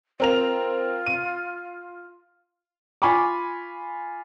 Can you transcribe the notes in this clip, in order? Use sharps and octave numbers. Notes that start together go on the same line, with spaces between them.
C4 F4 A#4 F7
D#7
F4 G#5 B5 C#6 D6